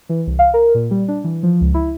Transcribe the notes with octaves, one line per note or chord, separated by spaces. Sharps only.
E3
C2
F5
A#4
A#2
G3
D4
E3
F3
C#2
E4